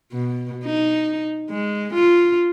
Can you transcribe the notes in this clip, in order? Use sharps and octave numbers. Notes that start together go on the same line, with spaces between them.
B2
D#4
G#3
F4